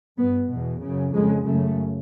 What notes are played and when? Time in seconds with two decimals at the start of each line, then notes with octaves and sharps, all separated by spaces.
0.18 G2 B3
0.49 E2 B2
0.82 F#2 C#3
1.14 F2 C#3 G#3
1.46 F#2 C#3 A3